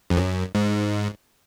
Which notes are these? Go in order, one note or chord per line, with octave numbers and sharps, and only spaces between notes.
F2
F#2
G#2